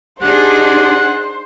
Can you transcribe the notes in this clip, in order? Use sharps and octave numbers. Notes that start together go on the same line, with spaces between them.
D4 D#4 G4 G#4 C5 F#5 C6